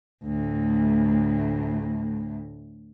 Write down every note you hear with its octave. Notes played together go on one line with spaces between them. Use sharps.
D2 A2